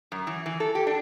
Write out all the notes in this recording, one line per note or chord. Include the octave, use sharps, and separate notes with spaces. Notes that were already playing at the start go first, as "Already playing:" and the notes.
F#2
E3
E3
A4
G4
D4